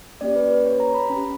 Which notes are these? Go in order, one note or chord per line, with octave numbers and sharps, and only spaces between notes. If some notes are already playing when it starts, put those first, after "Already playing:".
A#3 C#4 G4 D5
B4
B4
C#5
A#5
B5
C#4 G4